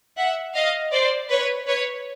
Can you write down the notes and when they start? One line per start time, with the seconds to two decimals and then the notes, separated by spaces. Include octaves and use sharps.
0.17 E5 F#5
0.55 D#5 F5
0.92 C5 D5
1.30 B4 C#5
1.67 B4 C#5